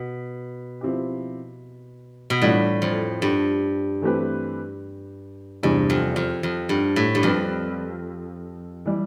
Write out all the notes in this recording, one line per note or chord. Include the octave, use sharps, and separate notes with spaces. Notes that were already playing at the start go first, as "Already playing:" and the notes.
Already playing: B2
F3 C4 E4 G4
B2
A2 E3 G3 D4 F4
F2
G2
E3 A3 C4 G4 B4
E2 G2 C3 E3 G3 C4
F2
F2
F2
G2
A2
G2
F2 G3 C4 G4 B4
E3 G3